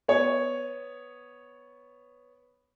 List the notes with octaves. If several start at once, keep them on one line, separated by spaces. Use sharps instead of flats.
B3 C#5